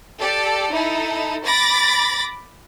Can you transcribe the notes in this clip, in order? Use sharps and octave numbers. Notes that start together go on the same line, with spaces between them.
G4 A4 D5
D#4 E4 A4
B5 D6 A6 A#6